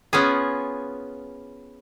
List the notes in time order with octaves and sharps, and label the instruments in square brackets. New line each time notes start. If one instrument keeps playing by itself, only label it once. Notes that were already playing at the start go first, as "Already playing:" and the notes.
[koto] B3 C#4 F4 G#4